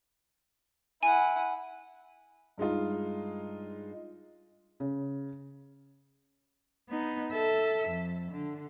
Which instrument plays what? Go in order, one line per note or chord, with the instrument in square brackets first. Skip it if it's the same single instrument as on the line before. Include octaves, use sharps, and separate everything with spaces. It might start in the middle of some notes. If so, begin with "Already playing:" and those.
[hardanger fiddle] E4 F#5 [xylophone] G#5
[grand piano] G2 G#3 D#4 F4
[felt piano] C#3
[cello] B3 D#4
A4 E5
F2
D3